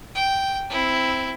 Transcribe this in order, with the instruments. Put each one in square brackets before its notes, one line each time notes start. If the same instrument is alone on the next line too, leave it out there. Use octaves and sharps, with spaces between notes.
[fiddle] G5
C4 E4